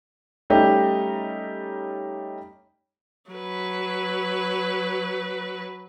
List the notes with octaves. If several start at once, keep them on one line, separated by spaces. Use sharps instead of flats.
G3 A3 C#4 D#4 G4
F#3 B4